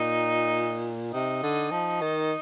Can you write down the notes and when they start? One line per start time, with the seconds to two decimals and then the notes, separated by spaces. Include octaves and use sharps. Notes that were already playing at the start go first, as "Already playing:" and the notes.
Already playing: A#2 D#4
1.13 C3 D#4
1.43 D3
1.72 F3
2.01 D#3